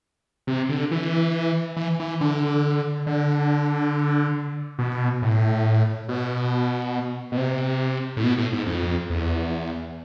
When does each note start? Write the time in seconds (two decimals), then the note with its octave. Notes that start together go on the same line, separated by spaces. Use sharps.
0.47 C3
0.69 D3
0.91 E3
1.77 E3
2.00 E3
2.21 D3
3.07 D3
4.79 B2
5.22 A2
6.08 B2
7.32 B2
7.37 C3
8.17 A2
8.24 B2
8.38 A2
8.52 G#2
8.67 F2
9.10 E2